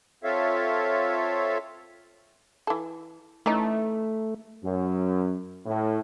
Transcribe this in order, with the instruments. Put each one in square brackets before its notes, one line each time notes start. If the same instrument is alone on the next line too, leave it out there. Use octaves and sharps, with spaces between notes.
[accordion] C4 F4 A4 C#5 E5 F5
[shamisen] E3 A4
[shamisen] E3 C#4 D#4 [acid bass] A3
[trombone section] F#2
A2